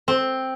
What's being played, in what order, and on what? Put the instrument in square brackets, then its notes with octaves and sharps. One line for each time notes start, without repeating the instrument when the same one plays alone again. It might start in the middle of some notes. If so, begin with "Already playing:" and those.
[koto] C4